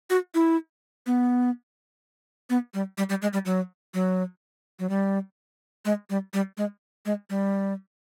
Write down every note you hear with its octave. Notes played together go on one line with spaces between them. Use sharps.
F#4
E4
B3
B3
G3
G3
G3
G#3
G3
F#3
F#3
F#3
G3
G#3
G3
G3
G#3
G#3
G3